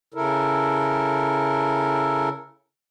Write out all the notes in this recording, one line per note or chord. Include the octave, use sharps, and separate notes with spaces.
C#3 E4 A4 A#4